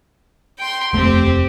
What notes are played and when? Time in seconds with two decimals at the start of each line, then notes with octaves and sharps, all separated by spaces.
0.59 G5 C6
0.93 F1 D#2 A3 C4 G4